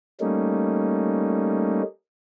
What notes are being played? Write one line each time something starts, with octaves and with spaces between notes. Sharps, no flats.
G3 A3 A#3 C#4 D#4